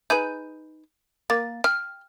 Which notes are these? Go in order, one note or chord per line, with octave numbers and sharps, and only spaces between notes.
D#4 G#4 B4 G6 D#7
A#3 A6
G5 F6